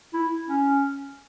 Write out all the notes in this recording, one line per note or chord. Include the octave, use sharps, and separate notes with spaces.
E4
C#4